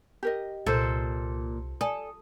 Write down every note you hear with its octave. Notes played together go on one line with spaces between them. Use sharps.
G4 A#4 D#5
C2 A#2 A4 C5
A4 D5 G#5 D#6